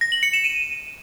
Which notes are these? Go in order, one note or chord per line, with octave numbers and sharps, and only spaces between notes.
A#6
F#7
C#7
E7
D#7